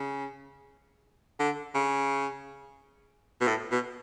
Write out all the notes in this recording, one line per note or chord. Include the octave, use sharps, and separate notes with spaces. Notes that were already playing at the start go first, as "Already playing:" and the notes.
Already playing: C#3
D3
C#3
B2
A2
B2